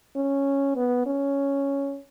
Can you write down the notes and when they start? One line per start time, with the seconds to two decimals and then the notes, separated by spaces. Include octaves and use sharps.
0.16 C#4
0.76 B3
1.07 C#4